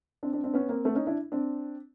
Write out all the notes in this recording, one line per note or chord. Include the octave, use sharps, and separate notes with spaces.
C4 D4
C4 D4
C4 D4
B3 C#4
A#3 C4
A3 B3
C#4 D#4
D4 E4
C4 D4